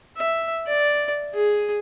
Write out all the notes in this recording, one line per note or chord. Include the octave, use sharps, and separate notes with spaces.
E5
D5
G#4